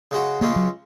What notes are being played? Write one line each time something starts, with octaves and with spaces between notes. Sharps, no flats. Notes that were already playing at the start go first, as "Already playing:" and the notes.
C#3 G#3 F#4
C#2 C#3 G#3 A#3 C#4
F#3